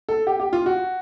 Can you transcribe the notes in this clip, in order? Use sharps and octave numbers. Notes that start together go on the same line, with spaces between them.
A4
G4
G4
F4
F#4